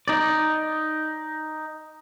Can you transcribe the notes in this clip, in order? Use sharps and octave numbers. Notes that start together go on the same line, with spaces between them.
D#4 D5